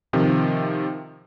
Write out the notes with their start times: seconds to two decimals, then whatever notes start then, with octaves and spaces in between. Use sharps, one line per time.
0.13 C3 D#3 F3